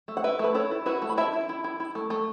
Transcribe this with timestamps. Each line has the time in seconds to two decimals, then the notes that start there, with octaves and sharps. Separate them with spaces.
0.08 A3
0.17 F#5
0.24 E4 B4 E5
0.39 A3 B4
0.55 E4 A4 C#5
0.71 E4
0.86 E4 F#4 B4
1.02 A3
1.09 B5
1.17 E4 E5 A5
1.33 E4
1.49 E4
1.64 E4
1.80 E4
1.95 A3
2.10 A3